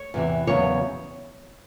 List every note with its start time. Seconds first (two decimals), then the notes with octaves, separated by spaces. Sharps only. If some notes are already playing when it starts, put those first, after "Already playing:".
Already playing: C#5
0.14 E2 C3 E3
0.47 E2 C#3 F#3 B3 C#5